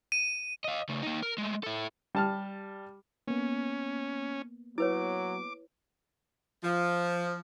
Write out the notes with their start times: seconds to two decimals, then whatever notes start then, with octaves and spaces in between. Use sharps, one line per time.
0.12 D#7
0.64 D#5 F5
0.89 C#3 A3
1.02 A#3 D#4
1.23 A#4
1.38 G#3 A3
1.63 E4 A4
2.15 G3 A5 F6
3.28 A#3 B3 C#4
4.78 F#3 E4 B4 C#5 D6
6.64 F3